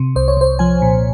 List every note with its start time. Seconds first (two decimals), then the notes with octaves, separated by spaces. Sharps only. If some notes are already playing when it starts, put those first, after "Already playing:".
Already playing: C3
0.16 C2 C5
0.28 C#5
0.37 C2 C5
0.59 F3 G#5
0.82 A#2